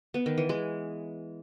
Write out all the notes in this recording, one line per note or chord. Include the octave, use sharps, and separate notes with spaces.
B3
D#3
E3
G#3